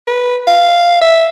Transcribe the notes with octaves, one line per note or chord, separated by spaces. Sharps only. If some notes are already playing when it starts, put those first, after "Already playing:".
B4
F5
E5